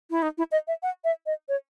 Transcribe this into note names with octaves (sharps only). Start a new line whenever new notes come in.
E4
D#4
E4
D#5
E5
F#5
E5
D#5
C#5